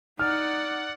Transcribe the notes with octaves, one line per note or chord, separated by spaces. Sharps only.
D#4 D5 F#5 F6